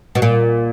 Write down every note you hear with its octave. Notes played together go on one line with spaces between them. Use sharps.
B2
A#2